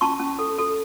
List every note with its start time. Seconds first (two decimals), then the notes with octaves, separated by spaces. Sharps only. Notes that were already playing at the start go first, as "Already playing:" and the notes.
0.01 C#4 A5 C#6
0.20 C#4
0.39 A4
0.59 A4